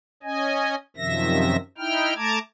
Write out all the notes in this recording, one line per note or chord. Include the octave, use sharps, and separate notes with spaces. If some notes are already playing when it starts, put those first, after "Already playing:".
C#4 D#5 G#5
F#2 C3 D#3 F3 E5 A#6
D#4 E4 G5 F6
A3 A5 A#5 D6 G#6